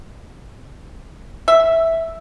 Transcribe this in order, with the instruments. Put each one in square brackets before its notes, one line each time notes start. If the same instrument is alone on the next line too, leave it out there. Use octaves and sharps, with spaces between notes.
[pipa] E5